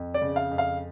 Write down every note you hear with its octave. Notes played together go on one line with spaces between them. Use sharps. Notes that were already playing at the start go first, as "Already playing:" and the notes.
Already playing: F2
D5
C#3
F5
F2
F5